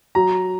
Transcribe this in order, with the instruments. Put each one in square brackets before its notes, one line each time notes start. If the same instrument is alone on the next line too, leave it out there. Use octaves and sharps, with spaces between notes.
[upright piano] F#3 [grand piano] A#5